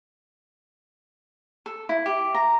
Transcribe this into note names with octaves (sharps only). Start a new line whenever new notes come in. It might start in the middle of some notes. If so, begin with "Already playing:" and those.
A4
E4
G4
A#5